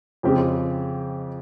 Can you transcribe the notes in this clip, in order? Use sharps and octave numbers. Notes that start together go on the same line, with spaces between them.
F2 C#3 G#3 C4 G4